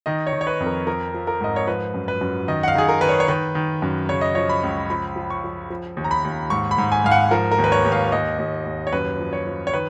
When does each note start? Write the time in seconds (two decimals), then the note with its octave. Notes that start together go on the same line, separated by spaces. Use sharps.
0.06 D#3 D#5
0.27 C#5
0.33 D#3
0.41 C#5
0.47 B4
0.60 F2
0.66 A#4
0.87 F3 A#4
1.14 F3
1.27 A#4
1.41 G#2 D#5
1.56 C#5
1.67 F3 B4
1.94 F#2
2.08 B4
2.21 F#2
2.48 D#3 D#5
2.63 F#5
2.68 F5
2.75 D#3 G#4
2.89 A#4
3.01 D#3 B4
3.09 C#5
3.20 C#5
3.28 D#3 B4
3.55 D#3
3.82 F#2
4.09 C#3 C#5
4.21 D#5
4.35 F3 C#5
4.49 B5
4.63 C#2
4.90 F3 B5
5.16 F3
5.30 C#6
5.44 F3
5.70 F3
5.97 D#2
6.04 A#5
6.11 B5
6.24 D#2
6.50 G#2 C#6
6.71 B5
6.78 G#2
6.92 G#5
7.04 G#2 F5
7.11 F#5
7.31 F3 A#4
7.51 A#4
7.58 D#2
7.64 B4
7.72 C#5
7.85 D#2
7.92 F5
8.12 D#2 D#5
8.38 D#2
8.65 D#2
8.87 C#5
8.92 F#2 B4
9.19 F3
9.33 C#5
9.47 F3
9.67 C#5
9.73 D#3 B4